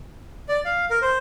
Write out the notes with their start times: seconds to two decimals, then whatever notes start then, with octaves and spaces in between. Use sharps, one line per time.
0.49 D5
0.65 F5
0.90 A#4
1.02 C5